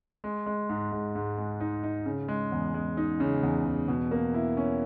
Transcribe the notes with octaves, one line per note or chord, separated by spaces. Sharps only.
G#3
G#3
G#2
G#2
G#2
G#3
D#4
D#4
C#3
G#3
E2
G#3
D#4
C#3
E2
E2
B2
A#3
E4
C#4